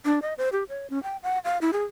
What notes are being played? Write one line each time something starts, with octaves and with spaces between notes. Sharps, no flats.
D4
D#5
C5
G4
C#5
C#4
G5
F#5
F5
E4
G#4